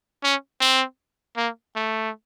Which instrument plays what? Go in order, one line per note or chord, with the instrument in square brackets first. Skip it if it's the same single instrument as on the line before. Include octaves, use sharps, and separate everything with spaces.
[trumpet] C#4
C4
A#3
A3